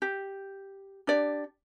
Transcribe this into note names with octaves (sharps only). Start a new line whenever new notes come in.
G4
D4 G4 D5